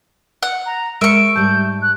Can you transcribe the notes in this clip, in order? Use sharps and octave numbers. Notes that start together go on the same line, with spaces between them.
F#5
A#5
G#3 A#4 E5 C#6 D7
G#2 G3 A5 G6
F#6